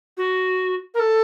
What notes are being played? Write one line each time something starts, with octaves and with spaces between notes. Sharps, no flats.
F#4
A#4
A4